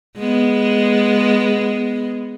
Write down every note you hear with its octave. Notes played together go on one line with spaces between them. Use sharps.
G#3 B3